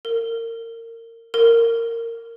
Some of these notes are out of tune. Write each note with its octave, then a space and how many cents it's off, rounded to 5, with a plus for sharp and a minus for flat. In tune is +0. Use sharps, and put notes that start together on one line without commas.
A#4 -25
A#4 -15